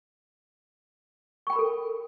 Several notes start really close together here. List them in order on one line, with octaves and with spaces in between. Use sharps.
C#6 G5 B5 A#4 A4